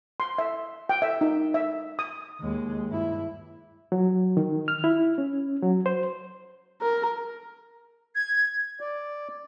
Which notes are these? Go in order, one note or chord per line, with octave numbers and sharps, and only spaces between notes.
C6
E5
G5
E5
D#4
E5
D#6
D#2 G#3
G2 E4
F#3
D#3
F6
E4
C#4
F#3
C5
A#4
G#6
D5